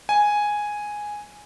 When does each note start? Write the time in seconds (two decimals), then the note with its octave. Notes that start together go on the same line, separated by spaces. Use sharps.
0.09 G#5